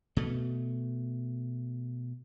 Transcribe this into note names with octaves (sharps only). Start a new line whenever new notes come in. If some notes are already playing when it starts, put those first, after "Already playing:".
B2 A3